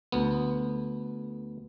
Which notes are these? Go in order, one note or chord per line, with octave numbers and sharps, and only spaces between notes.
D2 B3